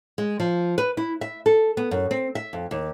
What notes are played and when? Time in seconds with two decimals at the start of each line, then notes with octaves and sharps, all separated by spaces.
0.18 G#3
0.40 F3
0.78 B4
0.97 E4
1.21 E5
1.46 A4
1.77 B3
1.91 F#2
2.11 C4
2.35 E5
2.53 F2
2.71 D#2